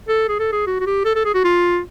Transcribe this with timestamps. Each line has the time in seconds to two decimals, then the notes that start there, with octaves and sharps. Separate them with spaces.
0.09 A4
0.29 G#4
0.40 A4
0.52 G#4
0.67 F#4
0.80 F#4
0.86 G4
1.05 A4
1.16 A4
1.25 G#4
1.34 F#4
1.44 F4